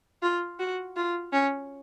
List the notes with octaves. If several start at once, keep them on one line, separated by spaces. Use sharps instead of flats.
F4
F#4
F4
C#4